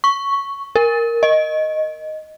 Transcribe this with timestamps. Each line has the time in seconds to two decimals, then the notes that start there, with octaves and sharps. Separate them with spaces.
0.04 C#6
0.75 A#4
1.23 D#5